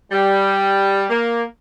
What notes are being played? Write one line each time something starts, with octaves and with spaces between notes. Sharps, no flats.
G3
A#3